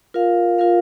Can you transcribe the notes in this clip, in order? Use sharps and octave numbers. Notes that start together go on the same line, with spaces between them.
F4 A#4 F5
F4 A#4 F5